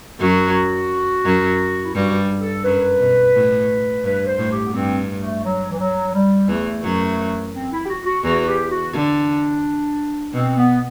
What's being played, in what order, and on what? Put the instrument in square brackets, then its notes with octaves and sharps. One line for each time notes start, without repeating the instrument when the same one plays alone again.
[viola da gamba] F#2 F#3 [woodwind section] F#4
[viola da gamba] F#2 F#3
[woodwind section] E4
[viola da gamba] G2 G3 [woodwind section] F#4
[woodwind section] A4
[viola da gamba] F#2 F#3 [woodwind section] B4
[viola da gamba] B2
A2
[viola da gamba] G2 [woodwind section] B4
[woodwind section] C5
[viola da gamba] A2
[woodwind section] G4
B3
[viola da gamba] G2 [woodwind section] C4
[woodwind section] A3
F#3
E3
F#3
G3
[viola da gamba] E2 E3 [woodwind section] A3
[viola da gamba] F#2 F#3
[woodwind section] C4
E4
G4
F#4
F#4
[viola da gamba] E2 E3 [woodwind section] F#4
[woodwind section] G4
F#4
[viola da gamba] D3 [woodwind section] D4
[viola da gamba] B2 [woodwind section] C4
[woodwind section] B3